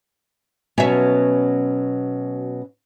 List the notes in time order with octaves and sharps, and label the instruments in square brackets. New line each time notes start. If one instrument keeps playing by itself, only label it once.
[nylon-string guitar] B2 F#3 B3 [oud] C#4 E5